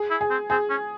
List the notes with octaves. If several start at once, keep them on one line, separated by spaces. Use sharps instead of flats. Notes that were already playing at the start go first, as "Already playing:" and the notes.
Already playing: G#4
E4
G#4
C4
C4 G#4
C#4